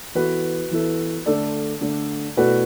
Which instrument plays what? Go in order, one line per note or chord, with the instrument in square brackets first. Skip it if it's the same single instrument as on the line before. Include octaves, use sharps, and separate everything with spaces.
[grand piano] E3 B3 E4 A4 [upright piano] F#4 B4
[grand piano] E3 B3 E4 A4
[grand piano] D3 A3 D4 [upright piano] A4 D5
[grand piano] D3 A3 D4
[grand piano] B2 A3 E4 A4 D5 [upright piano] F#4 B4